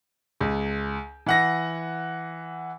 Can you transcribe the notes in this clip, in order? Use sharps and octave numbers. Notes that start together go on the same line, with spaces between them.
C#2
E3 F#5 A#6